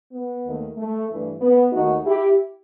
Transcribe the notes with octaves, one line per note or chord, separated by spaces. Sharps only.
B3
D#2 D#3 A3
A3
G2 E3 A3
B3
D#2 D#3 A3 D#4 F#4
E4 G4